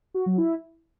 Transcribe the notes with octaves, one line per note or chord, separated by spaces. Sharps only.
F#4
F#3
E4